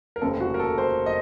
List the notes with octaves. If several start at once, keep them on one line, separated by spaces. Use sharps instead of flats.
A#4
F1 D#2 C#3 F3 C4 A4
F#4
A#4
A4
C5
D#5